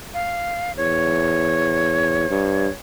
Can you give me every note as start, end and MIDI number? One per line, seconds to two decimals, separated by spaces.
0.14 0.72 77
0.77 2.30 40
0.77 2.70 73
2.30 2.68 43